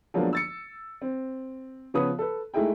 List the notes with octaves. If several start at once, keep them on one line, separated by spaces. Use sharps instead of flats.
F3 F#3 G#3 A#3 B3 D4
E6 A6 C#7
C4
C#3 F3 B3 B4 C#5 D#6
A4 B4
G#3 A3 D#4 E4 G#4 G5